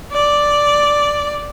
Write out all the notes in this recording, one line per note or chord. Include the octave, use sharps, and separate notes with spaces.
D5